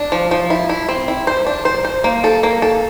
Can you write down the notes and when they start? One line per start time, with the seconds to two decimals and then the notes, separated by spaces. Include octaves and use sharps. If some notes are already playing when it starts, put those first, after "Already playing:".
Already playing: D4
0.12 F3
0.31 F3
0.50 E4
0.69 E4
0.89 C4
1.08 E4
1.27 C5
1.47 D4
1.65 C5
1.85 C5
2.04 A#3
2.24 A4
2.43 A#3
2.62 A4